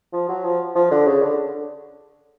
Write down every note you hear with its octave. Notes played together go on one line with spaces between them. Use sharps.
F3
F#3
F3
F3
D3
C#3
D3